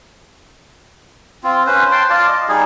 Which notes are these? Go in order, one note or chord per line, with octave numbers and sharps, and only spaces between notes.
C4 F4
C#4 B4 C5
G5 A5 C6
F4 D5 F5 A5
D#5
G3 D#4 G#4